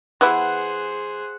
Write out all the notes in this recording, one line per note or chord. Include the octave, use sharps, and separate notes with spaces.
E3 B3 E4 G#4 C5 F#5